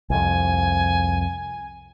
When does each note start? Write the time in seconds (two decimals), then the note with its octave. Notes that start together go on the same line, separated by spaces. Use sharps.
0.10 C2 F2 G#5